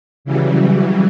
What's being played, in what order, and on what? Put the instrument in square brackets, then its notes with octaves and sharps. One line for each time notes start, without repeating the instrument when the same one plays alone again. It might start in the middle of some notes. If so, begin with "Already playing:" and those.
[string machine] C#3 E3 F#3 G3